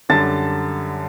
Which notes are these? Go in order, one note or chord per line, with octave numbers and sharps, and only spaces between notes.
F#2 D3 G3 A5 A6